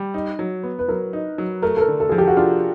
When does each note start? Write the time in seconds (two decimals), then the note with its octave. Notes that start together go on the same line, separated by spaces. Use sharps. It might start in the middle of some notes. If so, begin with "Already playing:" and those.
Already playing: G3
0.14 D#4
0.39 F#3
0.63 B3
0.79 B4
0.88 F#3 A#4
1.13 D#4
1.38 F#3
1.62 A3 A#4
1.77 A4
1.81 A#4
1.88 D3
2.00 A4
2.09 F3 G#4
2.18 G4
2.27 F#4
2.37 D4 F4